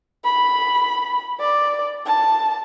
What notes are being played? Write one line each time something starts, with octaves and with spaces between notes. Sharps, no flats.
B5
D5
A5